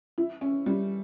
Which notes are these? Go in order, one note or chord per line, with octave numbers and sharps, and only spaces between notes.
E4
C#4
G3